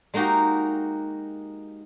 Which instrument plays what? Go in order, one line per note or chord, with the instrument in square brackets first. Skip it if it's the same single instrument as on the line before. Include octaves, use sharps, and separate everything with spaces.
[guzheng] G#3 A#3 D#4 F#4 G4